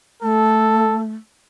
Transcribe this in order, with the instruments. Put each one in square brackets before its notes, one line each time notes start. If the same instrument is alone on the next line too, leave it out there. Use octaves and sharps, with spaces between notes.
[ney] A3 [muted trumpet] A4